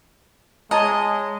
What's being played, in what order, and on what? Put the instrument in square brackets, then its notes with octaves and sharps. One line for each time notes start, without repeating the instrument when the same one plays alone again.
[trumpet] G#3 [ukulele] C#5 A5 A#5 [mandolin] D#5